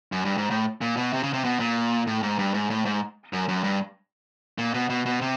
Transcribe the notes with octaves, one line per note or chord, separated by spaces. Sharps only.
F#2
G2
G#2
A2
A#2
B2
C3
C#3
C3
B2
A#2
A2
G#2
G2
G#2
A2
G#2
F#2
F#2
G2
A#2
B2
B2
B2
C3